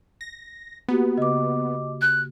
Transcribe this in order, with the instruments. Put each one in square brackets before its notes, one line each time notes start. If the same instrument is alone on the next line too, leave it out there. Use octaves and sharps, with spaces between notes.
[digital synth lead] A#6
[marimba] A#3 F#4 G4 [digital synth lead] B3
[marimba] C#3 [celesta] D#5 D6
[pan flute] F#6